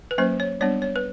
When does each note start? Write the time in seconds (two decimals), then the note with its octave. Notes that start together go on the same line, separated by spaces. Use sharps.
0.11 B4
0.18 F#3 A#3 C#4 C5
0.40 C#5
0.61 G3 B3 D4 C#5
0.82 C#5
0.96 B4